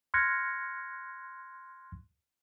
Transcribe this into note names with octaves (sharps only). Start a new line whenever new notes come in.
C6 F6 F#6 G#6 A#6 C#7